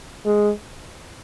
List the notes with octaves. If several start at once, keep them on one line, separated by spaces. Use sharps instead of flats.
G#3